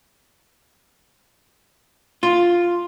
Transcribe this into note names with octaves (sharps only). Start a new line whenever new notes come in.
F4